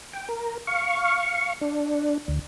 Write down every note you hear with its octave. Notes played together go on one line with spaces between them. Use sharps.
G5
A#4
F5 C#6
D4
D2